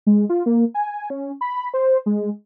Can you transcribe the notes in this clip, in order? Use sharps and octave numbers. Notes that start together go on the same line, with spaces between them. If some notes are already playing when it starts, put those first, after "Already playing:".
G#3
F4
A#3
G#5
C#4
B5
C5
G#3